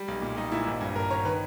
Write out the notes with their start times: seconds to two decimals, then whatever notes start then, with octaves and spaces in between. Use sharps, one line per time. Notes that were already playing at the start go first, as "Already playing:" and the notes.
Already playing: G3
0.08 B1
0.22 A#2
0.37 G3 D#4
0.52 A#2 E4
0.67 G#1
0.80 G2
0.96 G#1 A#4
1.11 G#1 C#5
1.25 D#3 B4